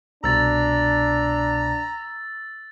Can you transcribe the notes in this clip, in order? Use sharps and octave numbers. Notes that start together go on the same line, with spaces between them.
C2 B2 D4 A#5 E6 A6